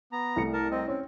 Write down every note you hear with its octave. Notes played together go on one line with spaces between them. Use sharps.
B3 A#5
C2 A3 C#7
A#4 A5
C4 D#5
C4 C#4